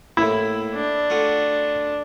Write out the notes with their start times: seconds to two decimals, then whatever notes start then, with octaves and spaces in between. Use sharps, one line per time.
0.17 A2 A#3 E4
0.75 D4
1.10 A3 F4 F#4